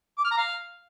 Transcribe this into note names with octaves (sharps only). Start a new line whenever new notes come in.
D6
F6
A#5
F5